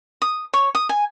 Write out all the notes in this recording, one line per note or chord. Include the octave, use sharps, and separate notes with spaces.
D#6
C#5
D#6
G#5